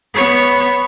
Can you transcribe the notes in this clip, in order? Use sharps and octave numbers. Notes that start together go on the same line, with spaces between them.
B3 C#5